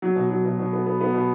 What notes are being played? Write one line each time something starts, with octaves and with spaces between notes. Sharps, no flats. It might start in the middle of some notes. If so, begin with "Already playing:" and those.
F#3
B2
F#3
B2
B2
B3
B3
B3
B2